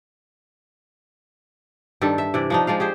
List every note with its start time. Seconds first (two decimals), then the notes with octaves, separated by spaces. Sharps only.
2.01 G2 D#3 G3 A4
2.18 E5
2.34 C3 E3 D5
2.50 F3 D4 D#4
2.67 F3 G#3 D5 F5
2.80 G4 G#4 C5